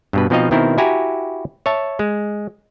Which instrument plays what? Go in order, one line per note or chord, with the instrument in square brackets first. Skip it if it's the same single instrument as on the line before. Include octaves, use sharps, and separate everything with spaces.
[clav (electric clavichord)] G2 B2 B4
B2 F3 C4 D#4 D#5 F5
B2 D#3 C4 E4 A#4
E4 F#4 G4 G#5 A#5
C#5 E5 A5
G#3